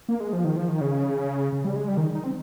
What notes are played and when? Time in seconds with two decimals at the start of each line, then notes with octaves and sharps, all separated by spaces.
0.09 A#3
0.20 G#3
0.33 F3
0.45 D#3
0.57 F3
0.68 D#3
0.81 C#3
1.53 C#3
1.65 G3
1.76 G#3
1.88 G3
1.97 D#3
2.15 D#4
2.24 C4